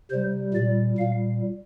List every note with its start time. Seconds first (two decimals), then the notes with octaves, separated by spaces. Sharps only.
0.10 C3 G3 C5
0.54 A#2 G3 D5
0.98 A#2 G3 F5